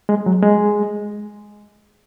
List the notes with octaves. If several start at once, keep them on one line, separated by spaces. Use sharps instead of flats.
G#3
F#3
G#3